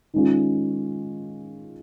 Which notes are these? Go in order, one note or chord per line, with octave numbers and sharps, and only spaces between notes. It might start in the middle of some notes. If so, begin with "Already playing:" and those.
D#3 G#3 C#4 F4